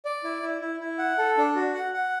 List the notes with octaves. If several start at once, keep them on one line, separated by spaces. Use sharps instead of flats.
D5
E4
E4
E4
E4
F#5
A4
D4
F#4
F#5
F#5